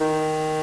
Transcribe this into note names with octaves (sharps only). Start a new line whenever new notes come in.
D#3